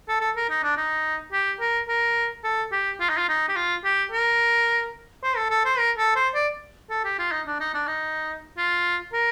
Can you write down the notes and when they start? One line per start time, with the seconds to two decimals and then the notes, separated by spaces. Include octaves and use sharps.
0.08 A4
0.21 A4
0.36 A#4
0.50 D#4
0.63 D4
0.77 D#4
1.33 G4
1.60 A#4
1.88 A#4
2.44 A4
2.72 G4
3.00 F4
3.09 D#4
3.18 F4
3.29 D#4
3.48 G4
3.56 F4
3.84 G4
4.12 A#4
5.23 C5
5.36 A4
5.50 A4
5.65 C5
5.78 A#4
5.98 A4
6.16 C5
6.35 D5
6.90 A4
7.05 G4
7.19 F4
7.32 D#4
7.47 D4
7.60 D#4
7.74 D4
7.87 D#4
8.58 F4
9.13 A#4